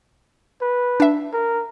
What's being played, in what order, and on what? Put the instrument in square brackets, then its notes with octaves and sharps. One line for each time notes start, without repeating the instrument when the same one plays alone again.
[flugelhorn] B4
[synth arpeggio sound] D4 E5
[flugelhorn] A#4